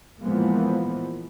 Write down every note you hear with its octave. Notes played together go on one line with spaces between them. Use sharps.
A#2 E3 F3 G#3 A#3 B3